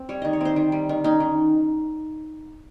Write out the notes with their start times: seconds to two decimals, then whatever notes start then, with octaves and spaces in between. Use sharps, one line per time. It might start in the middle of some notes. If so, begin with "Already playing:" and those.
Already playing: C4
0.09 G3 C#5
0.22 D#3 D#5
0.33 C#5
0.41 C4 C5
0.56 D#3
0.72 G3
0.89 D#3
1.04 C#4 D#4
1.20 D#3